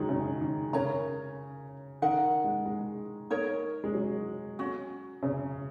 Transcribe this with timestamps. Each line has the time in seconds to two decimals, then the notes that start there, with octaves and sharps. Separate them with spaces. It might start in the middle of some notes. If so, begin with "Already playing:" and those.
Already playing: D#3 F#3 G#3
0.09 C#3
0.41 D#3
0.73 C#3 A#4 C#5 A#5
2.02 D#3 D#4 A#4 F#5
2.44 G#3
2.65 G#3
3.30 D#4 A#4 C#5
3.84 G#3
3.94 F#3
4.59 C#4 F#4
5.23 C#3